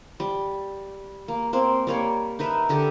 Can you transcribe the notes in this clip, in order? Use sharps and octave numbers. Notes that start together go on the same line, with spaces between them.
G3
A#3
A#3 C4
G3 A#3 C#5
D#4 A#4 B4 E5
D3 G4 A4